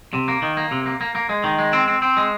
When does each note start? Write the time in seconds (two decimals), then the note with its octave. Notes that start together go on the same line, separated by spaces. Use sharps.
0.13 C3
0.28 A#3
0.42 D#3
0.57 A#3
0.71 C3
0.86 A#3
1.01 A#3
1.15 A#3
1.29 G#3
1.44 D#3
1.59 G#3
1.73 C4
1.88 C4
2.02 C4
2.17 G#3